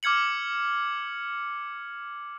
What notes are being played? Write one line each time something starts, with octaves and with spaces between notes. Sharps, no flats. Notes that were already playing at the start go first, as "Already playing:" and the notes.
D6 F6 G#6 C#7 F#7